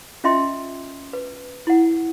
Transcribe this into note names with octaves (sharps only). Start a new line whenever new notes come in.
C#4 F4 D#5 E5 G5 C6
B4
E4 F#5